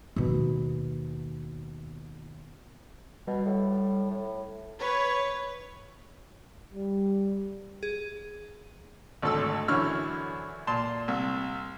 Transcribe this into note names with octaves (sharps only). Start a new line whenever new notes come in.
D#2 B2
B2 G3
A2
A2
B4 C#5
G3
G#4
G#1 D2 A4 E6
F#2 D3 E3 C#5 C#6 F6
A#2 A5 C6
C2